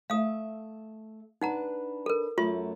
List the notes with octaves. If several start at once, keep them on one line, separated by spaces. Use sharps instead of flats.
A3 E5 F5 D#6
D4 D#4 B4 F#5 A#5
A4 A#4
F#2 F#3 A3 F4 C6